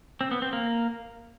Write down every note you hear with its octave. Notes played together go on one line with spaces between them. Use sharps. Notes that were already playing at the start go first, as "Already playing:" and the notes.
C4
B3
C4
A#3